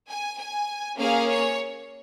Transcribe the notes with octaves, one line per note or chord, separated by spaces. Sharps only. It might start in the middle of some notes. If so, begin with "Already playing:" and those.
G#5
G#5
A#3 C#4 G#4 F5
C#5